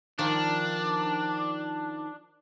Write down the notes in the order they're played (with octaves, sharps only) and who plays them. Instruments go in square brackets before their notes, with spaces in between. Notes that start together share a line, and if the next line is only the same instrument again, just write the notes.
[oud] D#3 F3 [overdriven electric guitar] D4